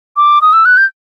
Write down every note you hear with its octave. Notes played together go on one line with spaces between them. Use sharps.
D6
D#6
E6
F#6
G6